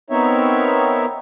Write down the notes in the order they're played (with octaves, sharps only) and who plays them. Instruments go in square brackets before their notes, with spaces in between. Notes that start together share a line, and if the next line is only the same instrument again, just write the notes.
[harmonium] B3 C4 D#4 A#4 C#5 E5